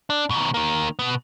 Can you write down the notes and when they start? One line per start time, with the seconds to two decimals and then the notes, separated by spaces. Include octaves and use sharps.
0.10 D4
0.30 B2 D#3
0.54 D#3 A#3
0.99 B2 B3